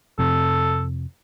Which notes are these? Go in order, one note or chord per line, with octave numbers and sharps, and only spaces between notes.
F2 C3 A4